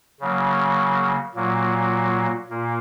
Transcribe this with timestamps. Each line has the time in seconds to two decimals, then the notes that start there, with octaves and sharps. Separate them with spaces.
0.21 C#3 F#3 A#3
1.35 A#2 F#3 A#3
2.49 A#2 A#3